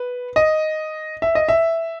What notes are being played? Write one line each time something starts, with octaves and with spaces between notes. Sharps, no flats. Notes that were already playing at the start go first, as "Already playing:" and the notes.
Already playing: B4
D#5
E5
D#5
E5